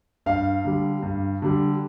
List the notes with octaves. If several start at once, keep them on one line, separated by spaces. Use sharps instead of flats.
G2 F5
D3 G3
G2
D3 G3